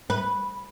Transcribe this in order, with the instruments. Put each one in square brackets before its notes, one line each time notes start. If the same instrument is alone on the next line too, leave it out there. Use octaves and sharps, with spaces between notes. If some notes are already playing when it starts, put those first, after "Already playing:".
[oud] B4